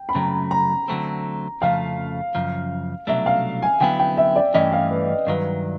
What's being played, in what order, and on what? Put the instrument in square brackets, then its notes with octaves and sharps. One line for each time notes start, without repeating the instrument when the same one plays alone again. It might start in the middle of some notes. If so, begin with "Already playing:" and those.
Already playing: [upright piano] G5
B5
[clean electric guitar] F#2 C#3 F#3 A3 [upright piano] A#5
[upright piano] A#5
[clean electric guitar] D3 F#3 A3 C4
[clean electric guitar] F2 C#3 F3 A3 [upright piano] F5
[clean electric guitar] F#2 C#3 F3
[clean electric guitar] C2 B2 F#3 A3 D4 [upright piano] E5
[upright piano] F5
G#5
[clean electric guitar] D3 F#3 B3 E4 [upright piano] G5
[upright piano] G5
E5
D5
[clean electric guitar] G2 E3 A3 C#4 [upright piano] D#5
[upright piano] F5
B4
[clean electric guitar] G2 D#3 F#3 [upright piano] B4